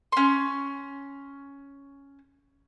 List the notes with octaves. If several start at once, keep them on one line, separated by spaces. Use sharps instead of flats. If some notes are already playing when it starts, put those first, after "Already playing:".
C#4 C6